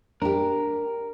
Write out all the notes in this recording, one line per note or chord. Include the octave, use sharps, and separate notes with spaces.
D4 G4 A#4